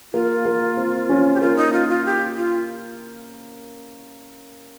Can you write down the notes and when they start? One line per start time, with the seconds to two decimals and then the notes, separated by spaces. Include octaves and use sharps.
0.13 A#3 F4
0.45 A#3
0.77 C4
1.09 C#4
1.35 G4
1.41 A#3 F4
1.56 D#4
1.73 F4
1.89 F4
2.05 G4
2.36 F4